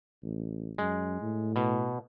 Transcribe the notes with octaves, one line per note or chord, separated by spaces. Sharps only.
A1
F#2 G#3
A2
B2